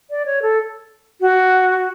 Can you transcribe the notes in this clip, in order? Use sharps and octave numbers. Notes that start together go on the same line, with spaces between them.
D5
C#5
A4
F#4